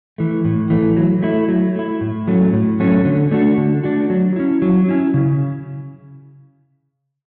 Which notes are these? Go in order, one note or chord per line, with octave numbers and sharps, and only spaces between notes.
E3 A3
A2
E3 A3
F#3
A3 E4
F#3
A3 E4
A2
F#3 A3 C#4
A2
F#3 A3 C#4
D3
A3 D4 F#4
D3
A3 D4 F#4
F#3
C#4 E4
F#3
C#4 E4
C#3